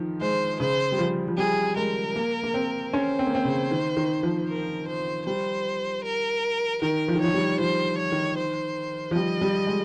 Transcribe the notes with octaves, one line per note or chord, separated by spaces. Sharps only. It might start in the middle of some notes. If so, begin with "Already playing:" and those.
Already playing: D#3 F3
G#3 C5
C#3 C5
G3
F3
F3
G3 G#4
G#3 A#4
A#3
A#3
C4
C#4 C5
C4
A#3
C4
C#3
D#3
D#3
F3
A#4
C5
G3 C5
A#4
D#3 A#4
F3
D#3
F3 C#5
G3
F3 C5
C#5
D#3
C5
F3
G3 D#5
G3
G#3